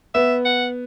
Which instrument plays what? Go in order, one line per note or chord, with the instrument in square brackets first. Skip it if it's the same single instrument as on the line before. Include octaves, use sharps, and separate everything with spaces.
[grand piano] B3 [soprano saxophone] E5
[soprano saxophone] F#5